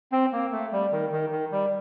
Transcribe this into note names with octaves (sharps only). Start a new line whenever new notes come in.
C4
A#3
A3
G3
D#3
D#3
D#3
G3